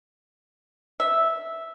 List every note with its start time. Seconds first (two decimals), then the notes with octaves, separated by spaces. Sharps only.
1.00 E5